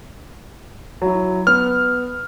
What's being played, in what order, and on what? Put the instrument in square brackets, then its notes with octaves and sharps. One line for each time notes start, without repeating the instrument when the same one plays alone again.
[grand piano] F#3 E4
[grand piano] B3 [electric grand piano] F6